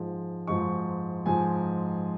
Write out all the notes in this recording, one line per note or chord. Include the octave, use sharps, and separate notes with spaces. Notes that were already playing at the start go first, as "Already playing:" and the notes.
Already playing: G#2 F3 G#3 D#4
G#2 F3 G#3 D#4 C#6
G#2 F3 G#3 D#4 G#5